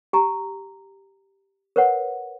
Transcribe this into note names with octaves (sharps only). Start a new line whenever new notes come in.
G4 G#5 A#5
A#4 B4 C#5 F#5